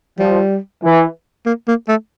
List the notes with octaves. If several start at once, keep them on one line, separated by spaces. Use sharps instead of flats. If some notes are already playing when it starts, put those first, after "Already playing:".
F3 G3
E3
A#3
A#3
A3